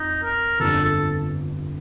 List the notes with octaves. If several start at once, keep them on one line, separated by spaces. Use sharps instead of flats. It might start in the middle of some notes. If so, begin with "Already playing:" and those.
Already playing: F2 D#4
A#4
G1 F2 D3 A4
A4